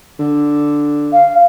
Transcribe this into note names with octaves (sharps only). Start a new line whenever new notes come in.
D3
F5